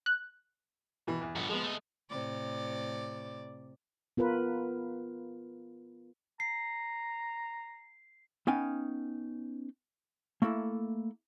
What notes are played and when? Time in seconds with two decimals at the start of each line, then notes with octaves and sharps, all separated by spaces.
0.06 F#6
1.07 B2 E3
1.21 E2
1.36 A#1 G2 B3
1.49 F3 G#3 B3
1.63 A3 D#5
2.10 A2 C3 D5
4.17 B3 F4 A#4 B4
6.40 A#5 C7
8.47 B3 C#4 D#4 F5 G5 G#5
10.42 A3 A#3 E4 A4